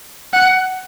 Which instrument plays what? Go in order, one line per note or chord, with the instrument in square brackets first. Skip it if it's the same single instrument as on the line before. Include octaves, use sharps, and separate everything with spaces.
[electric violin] F#5